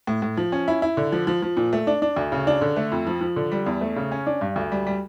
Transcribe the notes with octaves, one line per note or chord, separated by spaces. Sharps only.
A2
A2
F3
C#4
E4
E4
D3
F3
F3
F3
A#2
A3
D4
D4
D2
C#3
D4
D3
A3
F2
F3
F3
D3
G3
E2
A3
C#3
C#4
D4
G2
D2
G3
G3